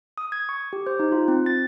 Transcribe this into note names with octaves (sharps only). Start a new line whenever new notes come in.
D#6
G#6
C#6
G4
C5
D#4
F4
C4
A6